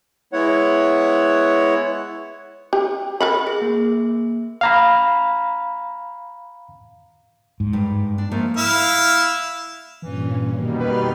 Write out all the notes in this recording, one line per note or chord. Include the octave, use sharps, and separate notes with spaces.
G#3 B3 E4 C#5 F#5
G4
A#4 F#5 B5
G#4
A#3
F5 A#5 B5
G#2
G2
D4
F3 A3 A#3
E4 F5
G2 A#2 E3 C#4
B2 D#3 G3 A#3
F2 B4 C6 F6